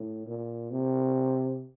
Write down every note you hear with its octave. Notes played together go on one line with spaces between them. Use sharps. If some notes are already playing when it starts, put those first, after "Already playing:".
Already playing: A2
A#2
C3